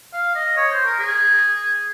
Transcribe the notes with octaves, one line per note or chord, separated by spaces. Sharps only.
F5
D#5
C#5
C5
A#4
G#4